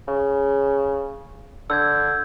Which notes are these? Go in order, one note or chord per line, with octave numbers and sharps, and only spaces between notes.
C#3
D3 E6 G6 G#6